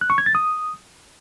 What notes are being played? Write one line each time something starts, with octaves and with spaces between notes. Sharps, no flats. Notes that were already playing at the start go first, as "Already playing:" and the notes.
F#6
C#6
G#6
A6
D#6